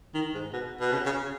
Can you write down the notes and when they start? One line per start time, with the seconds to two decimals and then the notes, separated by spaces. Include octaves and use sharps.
0.14 D#3
0.34 G#2
0.53 B2
0.80 B2
0.92 C#3
1.05 C#3